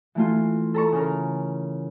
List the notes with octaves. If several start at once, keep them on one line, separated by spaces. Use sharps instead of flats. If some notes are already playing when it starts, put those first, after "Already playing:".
E3 A3 F4
A4 A#5 C#6
C#3 A#4